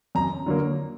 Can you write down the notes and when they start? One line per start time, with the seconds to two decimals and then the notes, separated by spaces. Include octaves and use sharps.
0.15 F#2 A#5
0.46 D3 F#3 A#3